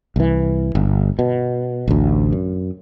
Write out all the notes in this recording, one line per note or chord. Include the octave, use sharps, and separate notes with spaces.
C2 E3
G1
B2
A1 D2
F#2